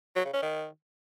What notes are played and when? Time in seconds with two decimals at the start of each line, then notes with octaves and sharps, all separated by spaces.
0.16 F#3
0.25 C#3
0.33 C#4
0.42 D#3